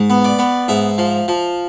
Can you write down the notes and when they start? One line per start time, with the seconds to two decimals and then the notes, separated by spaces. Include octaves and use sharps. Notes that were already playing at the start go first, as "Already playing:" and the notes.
Already playing: G#2
0.10 B3
0.24 D5
0.39 B3
0.68 G#2 E5
0.98 F3
1.28 F3